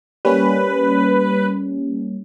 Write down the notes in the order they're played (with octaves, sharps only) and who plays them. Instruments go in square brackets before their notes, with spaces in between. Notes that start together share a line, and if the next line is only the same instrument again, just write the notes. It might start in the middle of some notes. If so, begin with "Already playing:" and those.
[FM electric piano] G3 A#3 C#4 [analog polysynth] B4